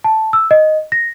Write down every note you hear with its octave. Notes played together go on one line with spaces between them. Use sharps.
A5
E6
D#5
A#6